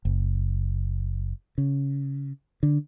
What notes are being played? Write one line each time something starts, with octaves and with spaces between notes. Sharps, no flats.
F#1
C#3
D3